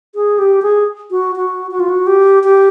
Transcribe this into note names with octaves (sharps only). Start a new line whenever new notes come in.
G#4
G4
G#4
F#4
F#4
F#4
F4
F#4
G4
G4